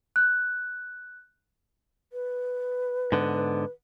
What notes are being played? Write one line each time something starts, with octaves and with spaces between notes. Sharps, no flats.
F#6 G6
B4
G#2 D3 B3